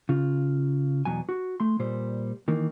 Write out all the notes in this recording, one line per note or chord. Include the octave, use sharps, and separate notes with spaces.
C#3 F4
E2 B2 F#3 G#5
F#4
A3 C6
A#2 G3 C5
D#3 E3 A#3